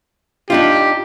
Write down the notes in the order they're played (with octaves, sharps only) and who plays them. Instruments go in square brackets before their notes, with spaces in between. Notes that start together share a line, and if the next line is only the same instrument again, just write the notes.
[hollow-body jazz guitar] D4 D#4 F4 [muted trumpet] G4